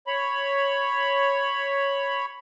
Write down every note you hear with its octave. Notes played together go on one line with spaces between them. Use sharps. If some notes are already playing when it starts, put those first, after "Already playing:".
C#5 B5